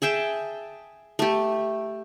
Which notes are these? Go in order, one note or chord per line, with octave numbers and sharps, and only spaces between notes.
G#4 E5 G5 A5
A3 G4